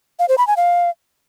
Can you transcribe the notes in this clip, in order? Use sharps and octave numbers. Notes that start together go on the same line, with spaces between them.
F5
C5
B5
G#5
F5